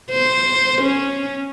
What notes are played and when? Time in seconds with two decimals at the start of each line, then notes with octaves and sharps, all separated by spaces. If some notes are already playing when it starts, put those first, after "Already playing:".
0.11 C5
0.82 C#4